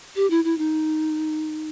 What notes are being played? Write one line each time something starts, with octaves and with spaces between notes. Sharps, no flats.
G4
E4
E4
D#4